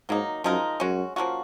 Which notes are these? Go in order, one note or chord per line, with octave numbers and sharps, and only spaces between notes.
G#2 F#3 A#3 D#4
F#2 F3 G#3 D#4 A#4
F#2 G#3 C#4 F#4
F3 A#3 C#4 F#4